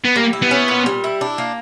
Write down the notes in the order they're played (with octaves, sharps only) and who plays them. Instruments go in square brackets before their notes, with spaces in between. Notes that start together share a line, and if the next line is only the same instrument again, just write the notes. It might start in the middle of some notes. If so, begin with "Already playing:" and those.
[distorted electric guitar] B3
[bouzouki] G3 [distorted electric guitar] A#3
[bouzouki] E4
[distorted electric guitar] B3
[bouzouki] C#4
A#2
G3
E4
D4
A#3